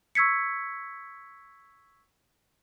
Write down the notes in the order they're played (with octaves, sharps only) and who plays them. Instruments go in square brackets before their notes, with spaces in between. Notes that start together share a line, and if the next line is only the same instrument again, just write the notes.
[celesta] C#6 E6 G#6 B6 C#7